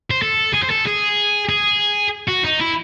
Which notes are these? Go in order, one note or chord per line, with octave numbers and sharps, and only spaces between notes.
C5
A4
G#4
C5
A4
G#4
G#4
F#4
D#4
E4